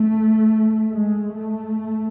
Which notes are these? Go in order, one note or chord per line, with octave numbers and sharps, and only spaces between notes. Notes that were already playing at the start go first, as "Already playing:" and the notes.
Already playing: A3
G#3
A3